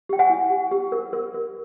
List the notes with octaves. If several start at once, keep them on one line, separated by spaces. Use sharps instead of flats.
G4 G5
F#5 G#5
E4
G4
G4
A#4
A#4
A#4